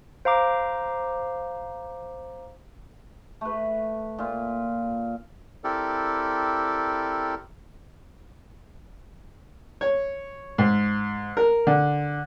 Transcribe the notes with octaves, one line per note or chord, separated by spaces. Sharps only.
C5 F5 A#5 D6
A3 B4
A#2 F4
C4 E4 G4 A4 A#4 D5
C#5
G#2
A#4
D3